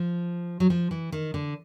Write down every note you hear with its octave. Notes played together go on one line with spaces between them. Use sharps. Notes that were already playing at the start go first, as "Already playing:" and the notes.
Already playing: F3
F#3
F3
E3
D#3
D3